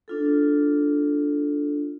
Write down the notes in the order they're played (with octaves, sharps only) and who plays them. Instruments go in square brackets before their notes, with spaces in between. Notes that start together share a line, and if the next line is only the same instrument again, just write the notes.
[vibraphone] D4 F4 A4